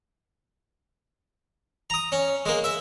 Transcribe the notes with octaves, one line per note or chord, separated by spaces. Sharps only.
A#5 D#6
C#4
G#3 A#3
E5